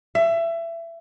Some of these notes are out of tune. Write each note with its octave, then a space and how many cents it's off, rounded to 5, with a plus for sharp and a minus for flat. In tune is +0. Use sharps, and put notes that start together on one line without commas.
E5 +25